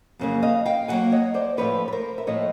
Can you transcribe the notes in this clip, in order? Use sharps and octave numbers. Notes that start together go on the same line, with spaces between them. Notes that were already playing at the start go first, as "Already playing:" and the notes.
F2 C#3 F#3 A#3
D#5 F5
F5 G5
F2 C#3 F#3 A#3 F#5 G#5
C#5 D#5
C5 D5
A2 F3 A3 B4 C#5
B4
A#4 C5
E5
A2 F3 A3 C#5 D#5